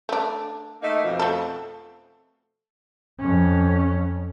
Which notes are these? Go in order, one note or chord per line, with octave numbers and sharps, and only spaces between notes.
A3 D4
A3 A#3 D#4
F2 B2 F3
A3 A4
F2 C#4